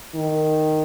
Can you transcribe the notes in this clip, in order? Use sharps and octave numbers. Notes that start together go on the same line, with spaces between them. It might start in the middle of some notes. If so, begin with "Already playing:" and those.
D#3